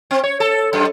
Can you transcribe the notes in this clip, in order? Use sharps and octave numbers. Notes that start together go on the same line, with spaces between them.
C4
C#5
A4
F#2